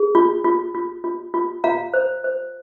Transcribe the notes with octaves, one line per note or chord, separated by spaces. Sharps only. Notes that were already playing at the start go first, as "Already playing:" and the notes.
Already playing: G#4
F4
F4
F4
F4
F4
F4 F5 A#5
C5
C5